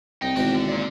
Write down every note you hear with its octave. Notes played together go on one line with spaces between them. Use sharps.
C2 D#4 G5
G#1 B2 E3 C4 F#4 G4
D3
A#3 D5